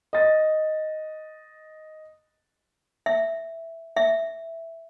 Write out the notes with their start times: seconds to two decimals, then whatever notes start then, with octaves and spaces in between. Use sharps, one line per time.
0.13 D#5 A6
3.06 E5
3.97 E5